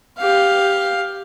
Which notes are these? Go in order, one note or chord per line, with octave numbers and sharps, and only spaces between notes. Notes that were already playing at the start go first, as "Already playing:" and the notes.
G4 F5